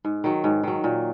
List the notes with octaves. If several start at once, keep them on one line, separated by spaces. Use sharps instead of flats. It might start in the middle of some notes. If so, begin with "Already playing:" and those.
G#2
D#3 F#3
G#2
D#3 F#3
A#2